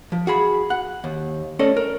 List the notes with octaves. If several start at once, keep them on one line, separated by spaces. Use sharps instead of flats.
F3
F#4 G#4 B5
F#5
D#2
A3 C#4 A4 D5 D#5
A#4